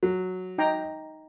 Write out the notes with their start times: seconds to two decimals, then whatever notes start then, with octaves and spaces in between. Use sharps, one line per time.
0.03 F#3
0.58 D#4 G5 A#5